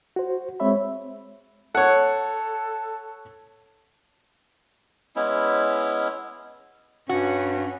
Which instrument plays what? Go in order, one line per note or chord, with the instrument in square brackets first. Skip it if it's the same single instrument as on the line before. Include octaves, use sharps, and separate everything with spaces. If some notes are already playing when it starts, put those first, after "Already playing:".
[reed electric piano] F#4 C5
G#3 C4 C#5 E5 B5
[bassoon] A4 [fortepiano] C#5 F#5
[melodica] G#3 B3 C#4 E4
[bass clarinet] G2 [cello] C#4 [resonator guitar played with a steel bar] F#4